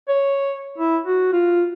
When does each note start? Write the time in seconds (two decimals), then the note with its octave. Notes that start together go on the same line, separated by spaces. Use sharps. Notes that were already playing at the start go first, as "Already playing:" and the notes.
0.08 C#5
0.78 E4
1.06 F#4
1.33 F4